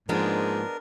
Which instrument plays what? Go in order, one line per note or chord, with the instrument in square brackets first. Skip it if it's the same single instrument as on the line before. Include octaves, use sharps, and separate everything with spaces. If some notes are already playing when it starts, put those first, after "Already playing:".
[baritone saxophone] G#2 [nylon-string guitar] F3 A#3 [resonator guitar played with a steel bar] G#3 B3 D4 [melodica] A#4